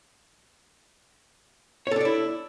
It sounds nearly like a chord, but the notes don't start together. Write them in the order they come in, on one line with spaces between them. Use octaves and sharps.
C#5 A4 D4 D5 E4